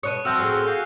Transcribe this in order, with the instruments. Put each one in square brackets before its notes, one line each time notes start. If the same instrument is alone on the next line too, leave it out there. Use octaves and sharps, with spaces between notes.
[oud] B2 C#5 [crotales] D#6 F#6 D#7
[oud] F3 E5 [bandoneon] C4 F#4 [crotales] E6 F6 G6
[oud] A2 G#4
[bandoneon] F#4 G#4 F5 [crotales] F#6 G6